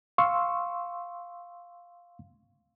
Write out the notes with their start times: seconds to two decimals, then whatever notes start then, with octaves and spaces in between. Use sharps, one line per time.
0.18 F5 C6 C#6 E6